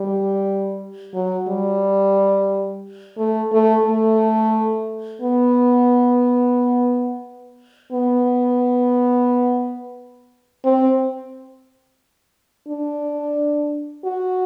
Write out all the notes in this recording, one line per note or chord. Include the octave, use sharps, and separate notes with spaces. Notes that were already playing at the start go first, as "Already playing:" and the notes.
Already playing: G3
F#3
G3
A3
A3
A3
B3
B3
C4
D4
F#4